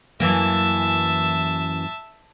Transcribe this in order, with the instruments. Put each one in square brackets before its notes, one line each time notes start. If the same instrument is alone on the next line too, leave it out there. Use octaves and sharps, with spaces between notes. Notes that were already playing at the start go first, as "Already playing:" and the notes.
[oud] F#2 E3 A#3 [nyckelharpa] E5 A5